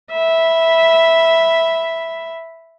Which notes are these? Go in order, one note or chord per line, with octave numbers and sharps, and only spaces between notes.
E5 B5